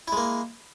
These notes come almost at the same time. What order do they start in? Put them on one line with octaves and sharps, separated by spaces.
E4 G#3 A#3